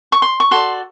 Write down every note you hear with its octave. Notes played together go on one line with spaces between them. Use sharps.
C#6
C6
C#6
F#4 A4 D5 C6